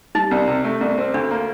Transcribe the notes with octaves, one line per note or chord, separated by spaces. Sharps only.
G3 D#4
C2
C3
A3
C2
C4
D2 D4
A#3